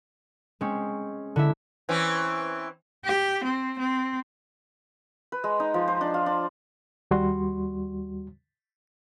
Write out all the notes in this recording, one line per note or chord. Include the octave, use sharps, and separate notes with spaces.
G#3 C4 C#4
D3 E4 E5
E3 C4 C#4
G4
C4
C4
B4
G#3
D#4
F3
C5
D4
F4
D4
D#2 G3 F#4 C6